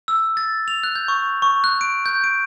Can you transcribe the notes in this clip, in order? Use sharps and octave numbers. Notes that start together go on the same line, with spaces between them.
E6
A6
F7
F#6
G6
C#6
C#6
F#6
D7
G6
D7